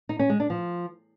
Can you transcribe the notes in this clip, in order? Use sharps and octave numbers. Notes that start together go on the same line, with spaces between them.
D#4
C#4
G#3
D4
F3